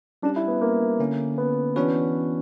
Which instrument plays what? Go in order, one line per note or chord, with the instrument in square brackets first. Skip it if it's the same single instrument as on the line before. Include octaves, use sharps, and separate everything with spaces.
[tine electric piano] G3 C#4 G4 [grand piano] D4
[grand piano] E4
B3
A#3
[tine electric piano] D3 A#3 C#4
[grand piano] B3
[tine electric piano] E3 B3 D4 F#4 B4 [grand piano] C#4